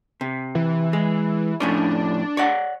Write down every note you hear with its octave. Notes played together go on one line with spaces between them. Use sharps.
C3
E3
G#3
F2 A2 C#4 D4
C#5 D5 F#5